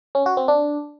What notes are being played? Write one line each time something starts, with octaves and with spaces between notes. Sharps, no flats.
C#4
F#4
C4
D4